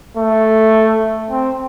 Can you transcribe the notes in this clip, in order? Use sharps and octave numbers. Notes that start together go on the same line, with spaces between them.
A3
C4